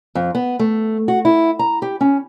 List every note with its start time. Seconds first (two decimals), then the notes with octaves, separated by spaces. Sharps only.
0.15 F2
0.35 B3
0.59 A3
1.08 F#4
1.25 E4
1.59 A#5
1.82 G4
2.01 C#4